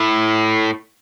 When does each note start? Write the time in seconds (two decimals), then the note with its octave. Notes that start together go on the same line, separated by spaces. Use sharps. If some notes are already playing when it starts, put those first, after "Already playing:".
Already playing: A2